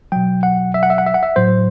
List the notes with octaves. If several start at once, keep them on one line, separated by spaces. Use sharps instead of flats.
B2 F#3 G5
F#5
E5
F#5
E5
F#5
E5
F#5
E5
A2 F#3 C5